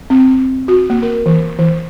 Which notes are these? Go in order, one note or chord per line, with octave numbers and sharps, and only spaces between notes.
C4
F#4
A#3
A#4
E3
E3